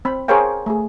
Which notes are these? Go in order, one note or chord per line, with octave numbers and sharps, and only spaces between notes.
C4 B5
G#4 A#4 C5 C#5 F5 G5
A3 G#4